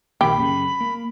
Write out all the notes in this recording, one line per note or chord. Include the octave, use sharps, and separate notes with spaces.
A#1 D#3 A#3 G4 B5
F#2 C#3
A#3